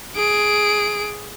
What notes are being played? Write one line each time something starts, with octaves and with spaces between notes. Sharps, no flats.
G#4 D7